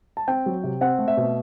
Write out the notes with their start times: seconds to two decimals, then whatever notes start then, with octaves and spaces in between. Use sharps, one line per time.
0.17 A5
0.28 C4 G5
0.46 F#3
0.64 C3
0.81 C4 F#5
0.99 A3
1.08 E5
1.17 B2